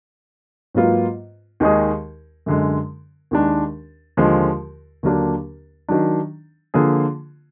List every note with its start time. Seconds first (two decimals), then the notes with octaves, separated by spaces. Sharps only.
0.75 G#2 F#3 A#3 F4 B4
1.60 D#2 D#3 G#3 D#4 G#4
2.46 F#2 D3 G#3
3.31 D#2 D#3 G#3 D4
4.17 D#2 D3 F3 G#3
5.03 D#2 D3 F#3 A#3 D4
5.88 D#3 F#3 D4
6.74 D3 F3 A#3 F4 G#4